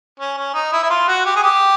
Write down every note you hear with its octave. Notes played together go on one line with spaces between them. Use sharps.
C#4
C#4
D#4
E4
E4
F4
F#4
G4
G#4
G4